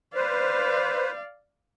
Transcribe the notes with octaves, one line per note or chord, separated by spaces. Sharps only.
B4 C5 D5 F5